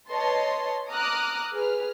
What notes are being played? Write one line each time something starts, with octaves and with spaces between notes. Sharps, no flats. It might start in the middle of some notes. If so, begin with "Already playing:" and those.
B4 C#5 D#5 A5 C6
A#5 D6 D#6 F6 F#6
G#4 B4 F6